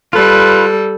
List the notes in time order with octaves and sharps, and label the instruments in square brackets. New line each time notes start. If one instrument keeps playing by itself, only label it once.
[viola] G3 A4 [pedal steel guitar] F4 B4